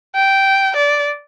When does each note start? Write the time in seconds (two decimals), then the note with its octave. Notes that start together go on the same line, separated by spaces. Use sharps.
0.16 G5
0.76 D5